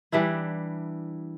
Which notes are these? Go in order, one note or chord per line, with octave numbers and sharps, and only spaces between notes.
E3 G3 D4 E4